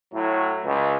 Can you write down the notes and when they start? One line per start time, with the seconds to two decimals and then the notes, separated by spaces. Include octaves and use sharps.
0.14 A2 F#3 E4
0.65 C#2